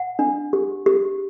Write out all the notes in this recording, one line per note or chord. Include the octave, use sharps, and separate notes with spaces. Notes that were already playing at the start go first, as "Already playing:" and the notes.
Already playing: F#5
D4
G4
G4